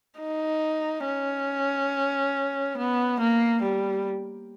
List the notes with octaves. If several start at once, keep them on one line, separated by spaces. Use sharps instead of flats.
D#4
C#4
B3
A#3
G3